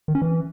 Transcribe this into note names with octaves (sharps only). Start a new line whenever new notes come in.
D#3
C#4
E3